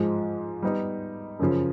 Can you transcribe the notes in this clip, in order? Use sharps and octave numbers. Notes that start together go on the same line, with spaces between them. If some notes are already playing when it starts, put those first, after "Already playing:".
Already playing: G#2 F3 G#3
G3 B3 D#4
F#2 C#3 F3